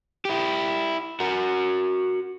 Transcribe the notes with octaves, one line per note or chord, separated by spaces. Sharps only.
E4 G4
F#4 A#4